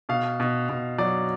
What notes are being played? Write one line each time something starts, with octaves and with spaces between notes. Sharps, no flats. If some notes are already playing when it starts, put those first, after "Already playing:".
B2 F5
B2
B2
F#3 D5